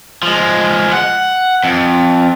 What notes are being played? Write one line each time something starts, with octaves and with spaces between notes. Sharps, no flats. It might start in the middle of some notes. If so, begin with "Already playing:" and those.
F3 G#3
F#5
F2